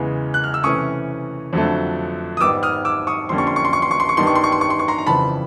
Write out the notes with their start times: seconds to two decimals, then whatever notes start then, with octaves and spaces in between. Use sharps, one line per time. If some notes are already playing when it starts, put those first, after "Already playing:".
Already playing: E2 C#3 E3 G#3
0.34 F#6
0.44 F6
0.54 E6
0.64 C3 E3 A3 C#4 C#6 D#6
1.53 F2 D3 F#3 A3
2.37 D#6
2.41 G#2 D#3 G3 B3 D6 E6
2.63 D#6 F6
2.85 D6 E6
3.07 C#6 D#6
3.29 F2 D3 G3 A#3 C#4 C6
3.38 C#6
3.47 C6
3.56 C#6
3.65 C6
3.73 C#6
3.82 C6
3.91 C#6
4.00 C6
4.09 C#6
4.17 G2 D#3 G3 B3 C6
4.27 C#6
4.36 C6
4.44 C#6
4.52 C6
4.61 C#6
4.70 C6
4.79 C#6
4.88 A#5 C6
4.98 A#5
5.06 F2 C#3 E3 G3 A5 B5